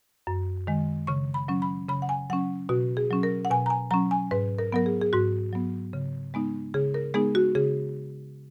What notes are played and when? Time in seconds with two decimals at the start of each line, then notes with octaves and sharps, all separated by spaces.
0.27 F#2
0.67 D#3 G#3
1.07 C#3 C#6
1.34 B5
1.48 F#3 C#4
1.62 B5
1.89 C#3 B5
2.02 F#5
2.09 G#5
2.30 F#3 F#5
2.33 C#4
2.69 B2 F#4
2.97 G#4
3.10 F#3 C#4
3.23 A#4
3.45 F#5
3.50 B2 G#5
3.66 A#5
3.70 G#5
3.91 F#3 C#4 A#5
4.11 G#5
4.31 G#2 B4
4.59 A#4
4.72 F#3 B3 A#4
4.86 G#4
5.01 G#4
5.13 G#2 F#4
5.53 F#3 B3
5.93 C#3
6.34 G#3 B3 D#4
6.74 C#3 G#4
6.94 A#4
7.14 G#3 B3 D#4 G#4
7.35 F#4
7.55 C#3 G#4